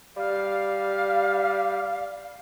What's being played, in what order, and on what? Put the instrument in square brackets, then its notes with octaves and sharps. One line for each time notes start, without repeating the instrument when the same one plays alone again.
[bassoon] G3 [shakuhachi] F5